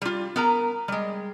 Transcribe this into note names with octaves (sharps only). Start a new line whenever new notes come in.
G3 F4
B3 A#4 A#5
G3 G#3